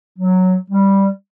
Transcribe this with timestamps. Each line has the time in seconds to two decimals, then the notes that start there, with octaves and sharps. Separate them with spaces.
0.19 F#3
0.71 G3